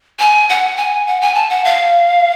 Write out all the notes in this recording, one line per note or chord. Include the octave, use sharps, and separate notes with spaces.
G#5
F#5
G#5
F#5
G#5
A5
F#5
F5